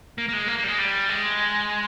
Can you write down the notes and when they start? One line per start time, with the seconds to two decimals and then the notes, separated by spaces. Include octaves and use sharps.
0.18 A#3
0.29 A#3
0.33 G#3
0.48 A#3
0.58 A#3
0.64 G3
0.68 G#3
0.79 G3
1.09 G#3